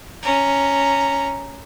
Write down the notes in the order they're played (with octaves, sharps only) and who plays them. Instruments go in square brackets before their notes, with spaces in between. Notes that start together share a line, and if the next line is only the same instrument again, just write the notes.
[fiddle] C#4 A#5